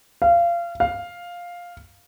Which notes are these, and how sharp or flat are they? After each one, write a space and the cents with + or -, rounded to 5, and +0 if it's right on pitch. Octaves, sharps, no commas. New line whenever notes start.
F5 -25
F5 +5